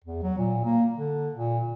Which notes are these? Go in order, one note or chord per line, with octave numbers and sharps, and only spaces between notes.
E2
F#3
A#2
A#3
D3
A#2